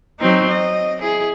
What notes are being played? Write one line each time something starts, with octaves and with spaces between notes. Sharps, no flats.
F#3 C4 D#4
D#5
E4 G#4